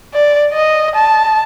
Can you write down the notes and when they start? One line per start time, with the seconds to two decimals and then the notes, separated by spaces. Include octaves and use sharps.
0.14 D5
0.54 D#5
0.96 A5